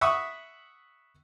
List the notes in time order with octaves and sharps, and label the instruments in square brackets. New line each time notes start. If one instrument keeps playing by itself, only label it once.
[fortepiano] E5 F#5 B5 C#6 D#6